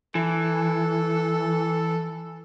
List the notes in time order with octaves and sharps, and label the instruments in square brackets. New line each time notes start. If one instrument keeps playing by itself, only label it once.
[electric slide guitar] E3 [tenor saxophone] A4